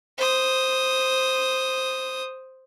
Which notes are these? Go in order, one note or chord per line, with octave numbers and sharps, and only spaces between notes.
C5 D#6